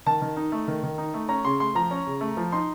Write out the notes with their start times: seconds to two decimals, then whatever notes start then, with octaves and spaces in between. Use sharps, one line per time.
0.06 D#3 A5
0.21 D#3
0.37 D#4
0.52 A3
0.68 D#3
0.83 D#3
0.98 D#4
1.14 A3
1.29 C#4 A#5
1.45 C#3 C6
1.60 A3 C6
1.75 F3 A#5
1.91 C#4
2.07 C#3
2.21 A3
2.37 F3
2.52 D#4 C6